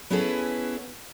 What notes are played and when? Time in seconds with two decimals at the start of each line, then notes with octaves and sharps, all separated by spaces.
0.10 B3 C#4 E4 G#4 A4 B4